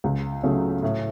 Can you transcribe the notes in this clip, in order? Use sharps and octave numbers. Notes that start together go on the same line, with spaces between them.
C#2
C#3 F#3 A3
A2